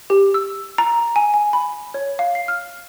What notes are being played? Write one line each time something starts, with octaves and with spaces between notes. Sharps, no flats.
G4
E6
A#5
G#5
G#5
B5
C#5
F5
C7
F6